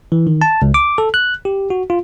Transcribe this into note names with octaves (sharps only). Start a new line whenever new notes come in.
E3
D#3
A5
C#2
D6
A4
F#6
G4
F#4
F4